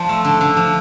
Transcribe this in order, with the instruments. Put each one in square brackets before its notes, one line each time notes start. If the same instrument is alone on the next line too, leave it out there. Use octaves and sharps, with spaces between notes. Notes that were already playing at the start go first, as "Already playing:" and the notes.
Already playing: [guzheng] F3 D4
A3
D3
D3
F3